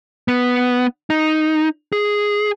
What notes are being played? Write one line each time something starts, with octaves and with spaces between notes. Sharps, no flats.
B3
D#4
G#4